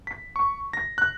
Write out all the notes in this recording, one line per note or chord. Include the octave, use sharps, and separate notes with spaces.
B6
C#6
A#6
F#6